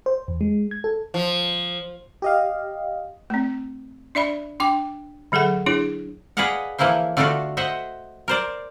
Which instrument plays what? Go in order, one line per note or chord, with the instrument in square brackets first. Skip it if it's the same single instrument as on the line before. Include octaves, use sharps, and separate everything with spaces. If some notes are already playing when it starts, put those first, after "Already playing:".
[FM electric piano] C5
E2
G#3
G#6
A4
[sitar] F3
[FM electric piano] G4 D#5 F5
[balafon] A3 C4
D4 D5 E5 B5
D4 G5 D6
D3 F#3 G#4 A4 F#5
D4 E4 G#4 C#5
[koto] G#4 B4 D5 D#5 F5 F#5
E3 F3 A#3 E4 C5
D3 A3 D4 F4 F#4 A4
C5 D#5 E5 F#5
A#4 C5 D5